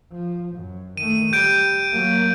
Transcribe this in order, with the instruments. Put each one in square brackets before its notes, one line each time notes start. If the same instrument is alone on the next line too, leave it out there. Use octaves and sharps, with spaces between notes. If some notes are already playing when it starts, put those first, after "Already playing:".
[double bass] F3
F#2
[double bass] D#3 A3 [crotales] D#7
[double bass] G3 [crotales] G6 D7
[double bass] F#3 A#3